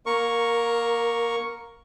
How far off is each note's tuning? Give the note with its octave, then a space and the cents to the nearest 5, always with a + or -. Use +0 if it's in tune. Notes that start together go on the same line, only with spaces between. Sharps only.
A#3 +20 A#4 +0 C#6 +0